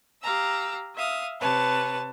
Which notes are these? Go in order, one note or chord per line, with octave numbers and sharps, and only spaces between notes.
G4 F5 A#5 E6
E5 F5 D#6
C3 B4 C#5 A5